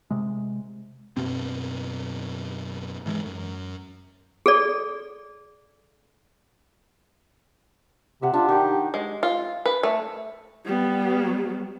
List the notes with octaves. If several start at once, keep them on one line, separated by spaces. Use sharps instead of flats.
C3 G#3
F#2 B2 C4
G#2 E3 G#3
F#2
G#4 A4 D5
C3 E5 F#5
D4 F4
D#3 G4
G#3
F4
B4
A3
G3 B3